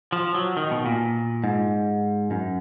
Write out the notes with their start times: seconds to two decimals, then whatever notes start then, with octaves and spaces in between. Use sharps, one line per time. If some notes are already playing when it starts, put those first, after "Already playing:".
0.12 F3
0.35 F#3
0.57 D#3
0.71 B2
0.86 A#2
1.44 G#2
2.31 F#2